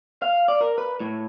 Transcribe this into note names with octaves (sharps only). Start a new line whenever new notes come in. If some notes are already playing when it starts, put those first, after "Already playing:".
F5
D5
A#4
B4
A2